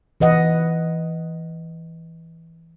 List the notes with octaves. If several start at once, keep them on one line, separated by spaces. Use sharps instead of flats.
E3 B4 D#5 F#5